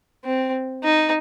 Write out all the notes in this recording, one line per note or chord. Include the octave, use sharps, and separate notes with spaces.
C4
D#4